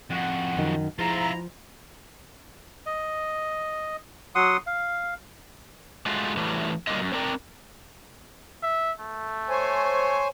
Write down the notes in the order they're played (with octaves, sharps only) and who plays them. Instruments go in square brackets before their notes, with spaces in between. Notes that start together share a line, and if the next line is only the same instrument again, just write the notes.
[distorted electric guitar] F2 F#4 [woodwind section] F#5
[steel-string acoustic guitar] F#2 D#3
[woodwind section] G#2 E4 A#5 [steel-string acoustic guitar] F3 [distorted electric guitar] F4 E5
[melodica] D#5
F#3 F#5 C6 D#6
F5
[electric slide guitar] G#3 A3 F4 F#4
E3 F#3 G3 A3
F#3 G3 A#3 D4 F4 D#5
F#2
C4 D4 A#4 D5 F#5 G5
[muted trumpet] E5
A3
[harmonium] C5 C#5 G#5